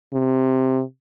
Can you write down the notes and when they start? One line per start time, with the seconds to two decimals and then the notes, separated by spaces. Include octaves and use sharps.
0.14 C3